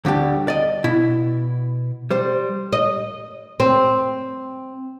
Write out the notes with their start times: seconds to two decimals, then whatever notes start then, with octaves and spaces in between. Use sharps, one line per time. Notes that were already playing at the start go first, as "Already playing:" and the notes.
0.05 D2 D3 G3 G4
0.48 D5 D#5
0.84 B2 E4
2.11 G3 C5
2.73 D#5
3.60 C4